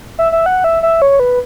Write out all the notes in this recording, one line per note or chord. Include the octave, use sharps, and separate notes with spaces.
E5
E5
F#5
E5
E5
C#5
B4